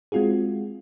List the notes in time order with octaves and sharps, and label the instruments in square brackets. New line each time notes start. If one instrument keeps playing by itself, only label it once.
[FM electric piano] G#3 C4 F4 F#4 G#4